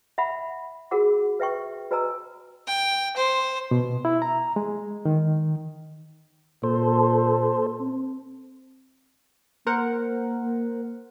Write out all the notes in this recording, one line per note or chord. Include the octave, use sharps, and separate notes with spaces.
E5 F#5 B5
F4 F#4 G#4 A#4 F#5 D6
B4 E5 G5 C#6
F#4 B4 D#5 G#5 A#5 E6
G5
C5
B2
E4
A#5
G#3
D#3
A#2 A4 C5
C4
A#3 A#4 C5 F#5